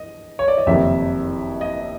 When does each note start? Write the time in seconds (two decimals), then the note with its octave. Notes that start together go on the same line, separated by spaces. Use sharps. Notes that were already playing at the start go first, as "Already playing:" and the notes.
Already playing: D#5
0.39 C#5
0.48 D5
0.58 D#5
0.67 F#1 F2 C3 D#3 E5
1.61 D#5